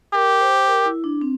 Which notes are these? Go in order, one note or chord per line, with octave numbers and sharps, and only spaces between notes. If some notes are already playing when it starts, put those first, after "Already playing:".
G4 A#4
C5
A#4
E4
D4
C4